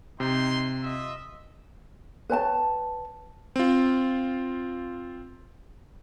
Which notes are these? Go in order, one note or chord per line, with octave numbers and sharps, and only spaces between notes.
C3 D#4 G5 C6
F4 D#5 E5
B4 C#5 G5 A5
C4 F4